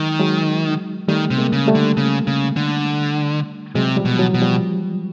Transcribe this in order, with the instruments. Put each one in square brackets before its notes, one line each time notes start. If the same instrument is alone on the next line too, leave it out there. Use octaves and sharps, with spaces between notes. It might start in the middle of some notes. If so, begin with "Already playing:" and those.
Already playing: [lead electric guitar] D#3 [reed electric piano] F#3 G#3
[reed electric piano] F#3 G#3
[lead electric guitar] D#3 [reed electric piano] G3 A3
[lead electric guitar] C3
[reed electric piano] G#3 A#3
[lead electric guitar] C#3
[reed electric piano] G3 A3
[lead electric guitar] D3
C#3
C#3
D3
[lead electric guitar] C3 [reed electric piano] F#3 G#3
[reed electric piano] F3 G3
[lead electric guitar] B2
[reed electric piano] E3 F#3
[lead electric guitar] B2
[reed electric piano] F3 G3